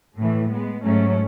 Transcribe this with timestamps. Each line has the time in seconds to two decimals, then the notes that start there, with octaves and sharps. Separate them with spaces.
0.17 A2 E3 A3
0.50 G#3 B3
0.83 G#2 F#3 A3 C#4